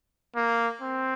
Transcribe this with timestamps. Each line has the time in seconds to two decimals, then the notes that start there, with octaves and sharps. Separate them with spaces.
0.36 A#3
0.82 C4